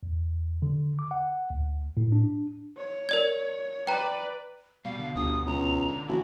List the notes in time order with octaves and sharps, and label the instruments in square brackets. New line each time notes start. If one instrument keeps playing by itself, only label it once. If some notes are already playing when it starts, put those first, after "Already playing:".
[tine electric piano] E2
D3
D6
F#5
D2
A2
D4
[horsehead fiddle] C#5
[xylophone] A#4 D5 G#6
[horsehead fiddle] B4 D5 [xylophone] G5 A#5
[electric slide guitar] B2 [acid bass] G3 [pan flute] F5
[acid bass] D3
[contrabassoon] G1 [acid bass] D2 [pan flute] D#6
[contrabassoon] C#2 [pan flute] A#5
[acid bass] D3
[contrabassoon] A1 [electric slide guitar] E4 [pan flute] F#4